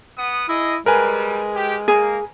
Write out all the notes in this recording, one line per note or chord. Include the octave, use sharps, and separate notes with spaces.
B3 F#5 D#6
E4 G#4 D#5
G3 G#3 A#4 B4 G#5
G4
A#3 G#4